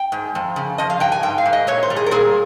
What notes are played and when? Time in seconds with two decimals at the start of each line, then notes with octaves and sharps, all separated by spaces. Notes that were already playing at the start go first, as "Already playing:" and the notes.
Already playing: G5
0.12 G#2
0.35 F2
0.56 C#3
0.78 F3 D#5
0.90 F5
1.00 G2 G5
1.12 G#5
1.23 G#2 G5
1.38 F5
1.45 G#2
1.53 D#5
1.67 A#2 C#5
1.83 C5
1.90 G3
1.96 G#4
2.06 A#4
2.11 A#2 G#4